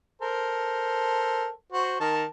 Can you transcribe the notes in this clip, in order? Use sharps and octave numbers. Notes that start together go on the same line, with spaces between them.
A4 A#4 C5
F#4 C5
D#3 A#4 A5